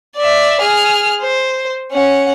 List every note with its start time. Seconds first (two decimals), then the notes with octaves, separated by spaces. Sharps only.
0.17 D5 E5
0.61 G#4 F6
1.21 C5
1.92 C#4 F#5